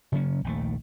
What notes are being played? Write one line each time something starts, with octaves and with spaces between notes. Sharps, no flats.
C#3 F#3 A#3 C#4
A#1 D#2 A3